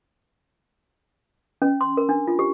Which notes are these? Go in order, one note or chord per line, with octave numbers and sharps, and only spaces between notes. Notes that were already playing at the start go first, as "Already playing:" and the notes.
C#4
C6
A#4
D4
F4
G4